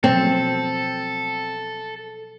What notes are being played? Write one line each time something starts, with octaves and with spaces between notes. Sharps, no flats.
B2 F3 F#3 C4 A4